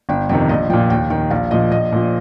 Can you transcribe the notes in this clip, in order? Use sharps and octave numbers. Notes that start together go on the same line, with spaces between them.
G1 G5
F2 C3 D#3 G5
A#1 D#5
A#2 F3 G5
D#2 G5
D#3 G5
A#1 F5
A#2 F3 D#5
A#1 D#5
A#2 F3